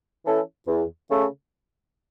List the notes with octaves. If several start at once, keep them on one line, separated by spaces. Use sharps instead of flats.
E3 C#4 E4 A4
E2
C#3 A3